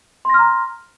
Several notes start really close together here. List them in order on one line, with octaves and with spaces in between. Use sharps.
C6 A#6 F6 A#5